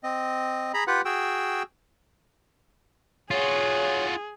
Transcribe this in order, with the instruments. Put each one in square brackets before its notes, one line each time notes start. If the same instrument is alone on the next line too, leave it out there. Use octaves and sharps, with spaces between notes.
[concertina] C4 D#5
G#4 A#5 B5
F4 G4 B4 F#5
F#4 G#4 G5 E6
[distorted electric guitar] F4 F#4 [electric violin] G#4 [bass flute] C#5